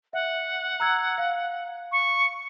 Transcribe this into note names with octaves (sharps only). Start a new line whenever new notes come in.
E5 F#5
A#5 E6 G#6
F5
C#6